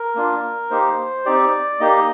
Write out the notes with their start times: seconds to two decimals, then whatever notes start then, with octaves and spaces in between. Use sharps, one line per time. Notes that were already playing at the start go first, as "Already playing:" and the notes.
Already playing: A#4
0.15 A#3 D4 F4
0.70 A#3 D#4 G4 C5
1.26 C4 D#4 G4 D5
1.80 A#3 D#4 G4 D#5